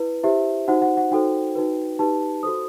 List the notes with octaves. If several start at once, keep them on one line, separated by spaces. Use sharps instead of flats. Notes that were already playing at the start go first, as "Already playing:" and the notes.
Already playing: E4 B4
E4 G4 C5 E5
D#4 F#4 C5 F#5
F#5
F#5
D#4 F#4 A4 C5 G5
D#4 F#4 B4
D#4 G4 B4 A5
F#4 A4 C5 D#6